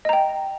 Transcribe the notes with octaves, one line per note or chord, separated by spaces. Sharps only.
D#5 G5 A#5